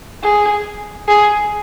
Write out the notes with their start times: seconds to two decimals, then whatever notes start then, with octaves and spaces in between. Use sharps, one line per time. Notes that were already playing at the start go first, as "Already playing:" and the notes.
0.23 G#4
1.08 G#4